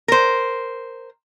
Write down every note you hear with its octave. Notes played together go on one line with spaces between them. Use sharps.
A#4 C5